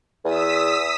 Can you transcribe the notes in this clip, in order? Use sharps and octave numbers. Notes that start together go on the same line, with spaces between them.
E2 D#6 E6 B6